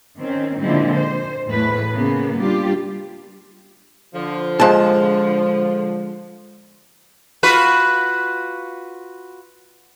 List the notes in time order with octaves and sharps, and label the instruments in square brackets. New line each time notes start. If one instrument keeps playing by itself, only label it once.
[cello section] D#3 C4 C#4
A#2 D3 F3 G#3 C4 E4
C5
E2 A2 A3 B4
C#3 A#3 B3
G3 D4 F4 G4
[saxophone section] D3 F3
[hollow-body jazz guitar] G#3 A5 [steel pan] F4 G#4 C5
[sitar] F4 F#4 B4